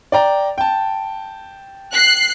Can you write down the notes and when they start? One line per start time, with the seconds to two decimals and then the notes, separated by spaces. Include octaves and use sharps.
0.12 D5 G5 A#5
0.58 G5 A5
1.92 F#6 C7